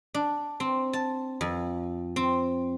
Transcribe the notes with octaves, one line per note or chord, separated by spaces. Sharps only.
D4
C4
A5
F2
C4